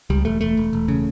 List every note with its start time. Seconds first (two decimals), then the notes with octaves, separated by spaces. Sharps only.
0.10 C#2 G3
0.25 E1 A3
0.41 E1 A3
0.57 E1
0.73 E1
0.88 C#3